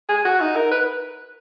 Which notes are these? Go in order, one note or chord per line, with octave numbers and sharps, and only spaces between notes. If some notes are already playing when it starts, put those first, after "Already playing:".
G#4
F#4
D#4
A#4
B4